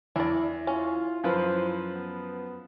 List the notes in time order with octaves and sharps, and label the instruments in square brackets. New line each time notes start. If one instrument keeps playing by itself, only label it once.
[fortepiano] E2 [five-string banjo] D4 D5 [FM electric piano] E4
[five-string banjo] C#4 [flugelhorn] F4
[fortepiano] F#2 F3 B4 [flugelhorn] C5
[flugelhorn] B3